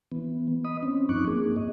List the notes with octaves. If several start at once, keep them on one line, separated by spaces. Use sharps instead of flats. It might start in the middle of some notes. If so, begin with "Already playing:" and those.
E3 B3
D#5 B5 D#6
C4 C#4
G2 F3 D#4 C#6 D6 F#6
A#3 G#4
G2 D#5